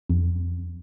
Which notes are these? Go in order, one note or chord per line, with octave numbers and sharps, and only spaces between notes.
F2